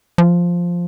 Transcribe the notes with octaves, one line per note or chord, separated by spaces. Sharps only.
F3